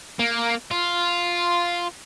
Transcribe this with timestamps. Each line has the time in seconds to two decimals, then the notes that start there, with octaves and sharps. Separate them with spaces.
0.19 A#3
0.71 F4